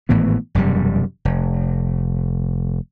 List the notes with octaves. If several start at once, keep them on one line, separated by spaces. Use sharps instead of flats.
G#1 A2 E3 B3
E1 F#2 C3 G3
F1